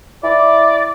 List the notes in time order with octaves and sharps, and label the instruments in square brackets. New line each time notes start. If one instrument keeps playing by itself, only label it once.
[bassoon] E4 [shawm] D5